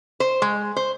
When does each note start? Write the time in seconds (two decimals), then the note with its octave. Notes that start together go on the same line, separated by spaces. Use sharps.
0.20 C5
0.42 G#3
0.76 C5